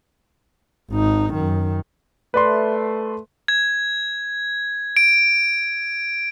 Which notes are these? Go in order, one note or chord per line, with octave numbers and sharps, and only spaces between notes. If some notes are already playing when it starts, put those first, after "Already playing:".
G#1 D#4
F#2 D#3
A3 B4 D5 C6
G#6
D7